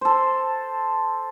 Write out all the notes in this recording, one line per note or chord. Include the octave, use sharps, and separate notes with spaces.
A4 C5